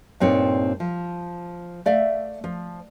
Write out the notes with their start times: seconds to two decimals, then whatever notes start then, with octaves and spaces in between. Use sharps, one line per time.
0.20 G2 A#2 C4 D#4 C#5
0.80 F3
1.86 A3 D5 E5 F5
2.44 F3